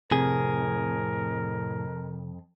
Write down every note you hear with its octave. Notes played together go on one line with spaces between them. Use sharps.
F2 A2 C3 G#4 A#4